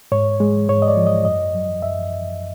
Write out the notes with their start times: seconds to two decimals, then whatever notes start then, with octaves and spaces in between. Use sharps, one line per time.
0.12 G#2 C#5
0.40 G#3
0.69 G#2 C#5
0.82 D#5
0.88 D5
0.97 F3
1.07 D#5
1.25 F#2 D#5
1.55 F#3
1.82 F#2 E5